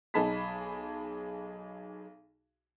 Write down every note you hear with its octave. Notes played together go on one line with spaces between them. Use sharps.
B1 D#4 G#4 A5 B5 B6